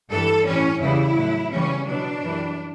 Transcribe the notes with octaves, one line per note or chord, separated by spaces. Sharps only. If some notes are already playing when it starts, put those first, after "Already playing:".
G2 E3 G3 A4
A2 E3 G3 C#4
E2 C#3 E3 G3 E4
A2 F#3
E2 C#3 E3 G3 C#4
B2 F#3 D4
F#2 E3 G3